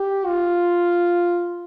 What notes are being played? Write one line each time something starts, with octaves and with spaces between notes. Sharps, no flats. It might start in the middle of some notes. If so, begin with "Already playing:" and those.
Already playing: G4
F4